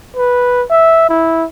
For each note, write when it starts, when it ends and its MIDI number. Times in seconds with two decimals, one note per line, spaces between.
0.17 0.64 71
0.70 1.05 76
1.09 1.45 64